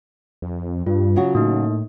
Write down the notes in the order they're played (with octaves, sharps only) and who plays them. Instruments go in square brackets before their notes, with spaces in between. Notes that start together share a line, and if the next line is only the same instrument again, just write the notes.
[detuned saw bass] F2
[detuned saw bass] G2 [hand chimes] F4
[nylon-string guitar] C#3 F#3 F#4
[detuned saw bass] A2 [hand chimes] A#3 D#4